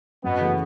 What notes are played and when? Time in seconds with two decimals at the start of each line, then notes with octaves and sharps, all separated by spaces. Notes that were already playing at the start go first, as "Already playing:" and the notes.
0.24 F#2 B2 B3
0.40 C#3 E3 A3